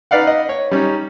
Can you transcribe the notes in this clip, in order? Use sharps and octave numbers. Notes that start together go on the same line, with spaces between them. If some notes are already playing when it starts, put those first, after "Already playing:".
D#4 B4 D5 F5 F#5
D#5
C#5
G3 C#4 D#4